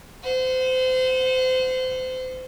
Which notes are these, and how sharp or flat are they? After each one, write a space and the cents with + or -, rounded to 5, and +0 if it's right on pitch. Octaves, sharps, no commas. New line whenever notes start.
C5 -30 F#5 -40